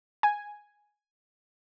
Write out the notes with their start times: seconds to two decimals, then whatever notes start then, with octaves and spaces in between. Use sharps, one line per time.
0.23 G#5